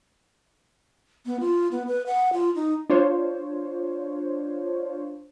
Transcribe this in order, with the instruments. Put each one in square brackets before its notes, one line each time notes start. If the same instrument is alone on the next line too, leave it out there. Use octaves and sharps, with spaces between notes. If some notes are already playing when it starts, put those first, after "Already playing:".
[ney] B3
F4
B3
B4
F#5
F4
D#4
[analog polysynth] D4 F4 C5 C#5